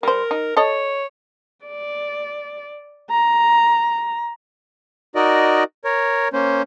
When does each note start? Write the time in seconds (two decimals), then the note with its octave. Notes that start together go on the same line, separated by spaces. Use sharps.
0.03 G3 A#4 C5
0.31 D#4
0.57 A4 C#5 D#5
1.66 D5
3.11 A#5
5.15 D#4 F#4 A#4 D5 D#5
5.85 A#4 C#5
6.33 A#3 C#4 C5